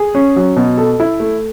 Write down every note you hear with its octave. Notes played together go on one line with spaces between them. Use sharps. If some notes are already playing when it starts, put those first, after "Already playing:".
Already playing: G#4
C#4
F#3
B2
A4
E4
A3